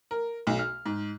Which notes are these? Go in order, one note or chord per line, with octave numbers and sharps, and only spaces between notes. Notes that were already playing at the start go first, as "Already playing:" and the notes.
A#4
B1
F6
G#2